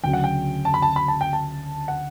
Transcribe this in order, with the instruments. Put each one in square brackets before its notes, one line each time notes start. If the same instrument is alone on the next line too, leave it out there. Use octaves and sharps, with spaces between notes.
[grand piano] D2 C#3 F#3 C#4 [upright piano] G5
[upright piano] F#5
G5
A5
B5
A5
B5
A5
G5
A5
F#5